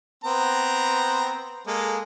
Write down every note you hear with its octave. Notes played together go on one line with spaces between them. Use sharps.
B3 C4 A#5
G#3 A#3 A4